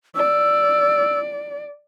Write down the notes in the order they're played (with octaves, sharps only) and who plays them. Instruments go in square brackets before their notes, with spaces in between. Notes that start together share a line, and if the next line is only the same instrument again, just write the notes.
[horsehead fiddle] D5 [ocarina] E6